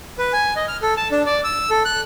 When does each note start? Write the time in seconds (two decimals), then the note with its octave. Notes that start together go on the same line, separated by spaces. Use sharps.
0.18 B4
0.33 G#5
0.56 D#5
0.68 F6
0.82 A4
0.97 A5
1.11 D4
1.26 D5
1.44 E6
1.70 A4
1.85 F#6